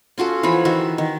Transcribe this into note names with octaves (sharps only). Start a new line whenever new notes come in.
C#4 F4 F#4 A4
E3 F3 C#5 B5
D#3 E3 F#4 E5
D#3